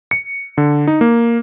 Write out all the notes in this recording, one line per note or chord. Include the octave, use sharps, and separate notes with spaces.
C#7
D3
D#4
A#3